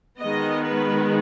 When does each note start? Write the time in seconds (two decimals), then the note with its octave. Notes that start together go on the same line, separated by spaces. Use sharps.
0.19 D#3 G#3 B3 D#5
0.64 B4